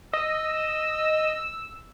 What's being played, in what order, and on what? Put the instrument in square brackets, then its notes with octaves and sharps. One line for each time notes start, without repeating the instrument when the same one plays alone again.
[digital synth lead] D#5 [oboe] E6